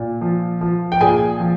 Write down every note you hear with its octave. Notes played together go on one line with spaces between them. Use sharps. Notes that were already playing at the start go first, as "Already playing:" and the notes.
Already playing: A#2
F3
F3
G5
A#2 G#4 G#5
F3